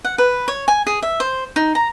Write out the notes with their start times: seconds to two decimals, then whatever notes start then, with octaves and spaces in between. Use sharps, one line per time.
0.05 F#5
0.18 B4
0.48 C#5
0.68 G#5
0.87 G#4
1.02 E5
1.20 C5
1.56 D#4
1.75 A#5